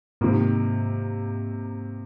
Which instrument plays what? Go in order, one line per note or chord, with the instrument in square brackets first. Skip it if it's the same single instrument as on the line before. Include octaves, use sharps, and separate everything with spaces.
[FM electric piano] G#2 [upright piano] C3 D#3 A#3